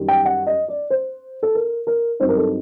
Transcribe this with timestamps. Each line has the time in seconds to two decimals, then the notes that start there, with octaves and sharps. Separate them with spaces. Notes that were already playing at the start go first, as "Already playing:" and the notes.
Already playing: F#2 D#3 G3
0.08 G5
0.25 F#5
0.47 D#5
0.68 D5
0.90 C5
1.43 A4
1.55 A#4
1.87 A#4
2.20 G2 F#3 C4 D#4 C5
2.29 A#4
2.37 A4